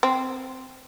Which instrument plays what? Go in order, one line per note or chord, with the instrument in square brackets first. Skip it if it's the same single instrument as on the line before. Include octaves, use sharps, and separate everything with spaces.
[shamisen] C4